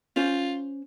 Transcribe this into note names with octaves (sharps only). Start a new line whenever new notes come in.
C#4 F4 C5